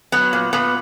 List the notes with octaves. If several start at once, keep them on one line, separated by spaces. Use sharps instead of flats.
F#3 B3
A#2
A#2 B3